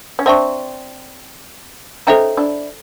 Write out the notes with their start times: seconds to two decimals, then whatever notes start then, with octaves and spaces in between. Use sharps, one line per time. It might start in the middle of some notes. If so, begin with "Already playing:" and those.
0.19 C#4
0.26 C4 D4 C5 E5 A5 C#6
2.07 C#4 D#4 A4 C5 E5 G5 A#5
2.37 D4 E4